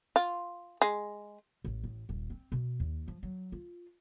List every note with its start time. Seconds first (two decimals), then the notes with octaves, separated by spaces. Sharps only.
0.16 F4
0.82 G#3
1.65 A1
1.83 A1
2.09 D#1
2.30 C4
2.52 B2
2.80 D#2
3.08 F3
3.23 F#3
3.52 F4